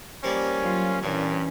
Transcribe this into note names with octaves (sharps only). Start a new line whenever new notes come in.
F3 G3 A#3 C#4
F#3 F4
G2 A#2 E3 C#4